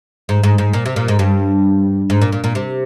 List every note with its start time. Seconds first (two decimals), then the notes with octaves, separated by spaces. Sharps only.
0.29 G#2
0.43 G#2
0.58 G#2
0.73 A#2
0.86 C3
0.96 A#2
1.08 G#2
1.19 G2
2.10 G#2
2.22 A#2
2.32 A#2
2.44 A#2
2.55 C3